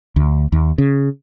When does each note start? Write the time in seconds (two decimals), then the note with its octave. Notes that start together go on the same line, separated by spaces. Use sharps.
0.16 D2
0.52 D#2
0.78 C#3